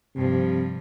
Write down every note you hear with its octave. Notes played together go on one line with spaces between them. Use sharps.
G2 C3 F3